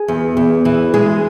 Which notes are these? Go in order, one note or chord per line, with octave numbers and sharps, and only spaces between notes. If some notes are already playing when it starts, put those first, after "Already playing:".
Already playing: G#4
E2
E2
E3
G#3 G#4